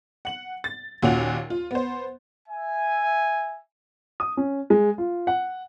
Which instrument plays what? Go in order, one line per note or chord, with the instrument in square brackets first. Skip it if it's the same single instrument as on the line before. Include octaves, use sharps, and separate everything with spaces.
[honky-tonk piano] F#5 F#7
A6
D#2 A#2 C#4 F#4 F7
F4
B3 C5
[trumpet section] E5 G#5
[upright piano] D#6
C#4
G#3
F4
F#5